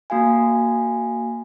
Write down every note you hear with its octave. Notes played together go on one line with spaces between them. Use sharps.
A#3 F#4 F5 G#5